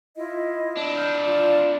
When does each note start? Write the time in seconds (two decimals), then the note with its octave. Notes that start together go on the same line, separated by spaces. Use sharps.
0.16 E4 F4 D#5
0.77 D4 E4
0.96 F6 G6
1.23 F4 D5